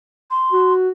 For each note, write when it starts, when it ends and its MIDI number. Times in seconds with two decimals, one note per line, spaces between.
0.31 0.73 84
0.52 0.89 66